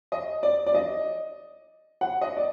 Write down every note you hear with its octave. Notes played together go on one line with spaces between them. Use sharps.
D#5
D5
D5
D#5
F#5
D#5
D5